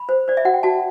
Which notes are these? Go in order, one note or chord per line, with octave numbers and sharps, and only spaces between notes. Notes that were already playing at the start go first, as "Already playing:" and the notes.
Already playing: B5
C5
C5 D5
E5
F#4 F#5
G5
F#4 A5